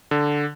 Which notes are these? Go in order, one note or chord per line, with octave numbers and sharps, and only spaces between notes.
D3